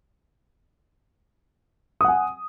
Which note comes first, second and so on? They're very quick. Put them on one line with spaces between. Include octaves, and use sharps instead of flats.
D#6 F#5 G#5